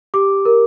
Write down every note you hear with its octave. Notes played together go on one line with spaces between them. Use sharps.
G4 D6
A#4